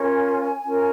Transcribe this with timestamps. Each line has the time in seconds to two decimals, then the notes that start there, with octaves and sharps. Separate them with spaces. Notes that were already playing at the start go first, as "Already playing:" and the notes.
Already playing: C#4 F4 A#4 C#5 G#5
0.64 C#4 F4 A#4 C#5